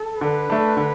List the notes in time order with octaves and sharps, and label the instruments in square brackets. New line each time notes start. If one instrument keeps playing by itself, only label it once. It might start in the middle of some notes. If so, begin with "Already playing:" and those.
Already playing: [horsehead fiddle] A4
[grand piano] D3 [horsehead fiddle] B4
[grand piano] A3 D4
D3